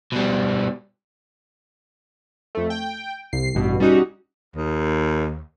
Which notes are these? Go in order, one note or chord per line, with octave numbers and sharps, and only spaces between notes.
B2 G3
F2 A3
G5
C2 C7
A1 G2 B2
G3 C#4 D#4 F#4
D#2